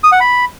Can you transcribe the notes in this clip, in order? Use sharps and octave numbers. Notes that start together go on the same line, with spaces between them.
D#6
F#5
B5